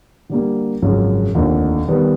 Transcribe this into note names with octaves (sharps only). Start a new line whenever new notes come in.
D3 G3 A#3
G#1 F#2 C#3 F3 G#3
F1 D#2 D3 F3
D#3 G3 B3